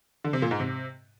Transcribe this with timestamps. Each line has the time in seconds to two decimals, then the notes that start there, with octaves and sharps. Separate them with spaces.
0.24 D3
0.33 C3
0.42 A#2
0.51 G#2
0.60 C3